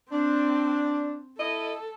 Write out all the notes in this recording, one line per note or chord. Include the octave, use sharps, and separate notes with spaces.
C4 D4
E4 A4 D#5